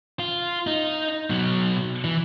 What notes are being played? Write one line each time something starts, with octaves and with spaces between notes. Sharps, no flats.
F4
D#4
B2 F#3
E3